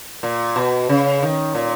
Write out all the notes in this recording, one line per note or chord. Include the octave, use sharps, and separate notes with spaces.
A#2
B2
C#3
D#3
A#2